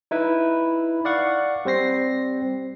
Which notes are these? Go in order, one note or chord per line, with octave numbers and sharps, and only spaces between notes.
D#4 E4 B4
D5 F5 F#5 C#6
G3 C4 C5 A#6 C7